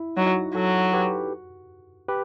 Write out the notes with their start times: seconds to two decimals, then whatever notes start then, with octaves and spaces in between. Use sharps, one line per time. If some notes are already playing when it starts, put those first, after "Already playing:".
Already playing: E4
0.17 F#3 D#4 F#4
0.55 F#3 F#4 A4
0.93 G4 B4
2.09 G4 B4